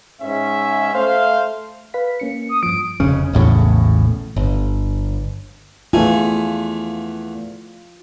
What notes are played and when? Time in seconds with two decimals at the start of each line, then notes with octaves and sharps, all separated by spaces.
0.21 G#2 C#4 E5
0.94 A3 C5 F5
1.94 B4 F5 B6
2.20 A#3 C#4 C#7
2.49 D#6
2.63 G2 F3 D7
3.00 F1 C#3 C#4
3.33 A#1 E2 A2 C#3
4.37 G1
5.93 E2 A3 F4 G#5